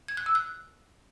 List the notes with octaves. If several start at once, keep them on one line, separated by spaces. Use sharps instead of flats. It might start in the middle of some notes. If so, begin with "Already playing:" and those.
G#6
F#6
E6
F#6